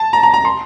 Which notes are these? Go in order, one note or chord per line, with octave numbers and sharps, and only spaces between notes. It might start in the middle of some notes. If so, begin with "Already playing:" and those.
Already playing: A5
A#5
A#5
A#5
C6